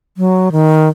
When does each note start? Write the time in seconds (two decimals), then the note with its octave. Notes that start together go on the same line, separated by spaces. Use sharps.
0.17 F#3
0.52 D#3